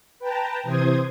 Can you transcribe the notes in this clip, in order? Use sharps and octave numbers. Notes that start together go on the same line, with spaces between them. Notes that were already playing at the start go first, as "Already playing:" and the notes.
B4 G5 A5 A#5
C3 E3 C5 C6 D#6 G#6